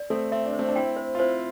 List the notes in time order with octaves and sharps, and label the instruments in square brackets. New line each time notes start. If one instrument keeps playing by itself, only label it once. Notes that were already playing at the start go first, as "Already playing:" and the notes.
Already playing: [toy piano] D5
[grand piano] A3 C4 [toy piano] A4
[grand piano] C4 [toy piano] E5
[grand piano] D4
[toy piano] C5
[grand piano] A3 C4
D4
[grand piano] C4 E4 [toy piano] G5
[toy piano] C5
[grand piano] F4
[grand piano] C4 E4 [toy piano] C5